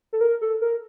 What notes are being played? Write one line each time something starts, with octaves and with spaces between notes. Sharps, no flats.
A4
A#4
A4
A#4